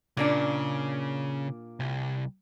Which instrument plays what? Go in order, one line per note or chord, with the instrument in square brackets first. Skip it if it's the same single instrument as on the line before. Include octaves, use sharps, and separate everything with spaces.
[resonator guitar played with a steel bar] A#2 A#3 D4 [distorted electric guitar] C#3
[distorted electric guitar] C2